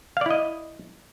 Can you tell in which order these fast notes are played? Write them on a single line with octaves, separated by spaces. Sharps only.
F5 D5 E4 D#5